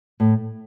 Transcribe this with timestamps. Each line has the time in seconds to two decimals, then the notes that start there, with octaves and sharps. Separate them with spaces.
0.20 A2